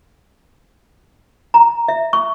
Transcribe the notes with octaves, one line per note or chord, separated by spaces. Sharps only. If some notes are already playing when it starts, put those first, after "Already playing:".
A#5
E5
C#6